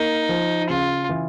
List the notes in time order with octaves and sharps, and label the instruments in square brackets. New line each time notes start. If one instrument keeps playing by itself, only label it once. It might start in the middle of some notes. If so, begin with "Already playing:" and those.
Already playing: [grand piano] A#3 [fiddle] D#4
[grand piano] F3
[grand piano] C#3 [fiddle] F4
[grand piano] E3